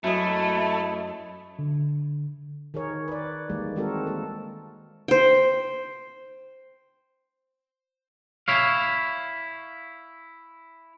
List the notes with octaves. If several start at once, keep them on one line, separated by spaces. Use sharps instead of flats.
F#2 A3 E4 D#5
D3
D#3 G#4 A#4 C#5
B4 D5
D#3 E3 G3 G#3 A#3
D#3 G#3 C4 F#4 A4 A#4
A#3 A4
C5 G5
E4 C#5 F5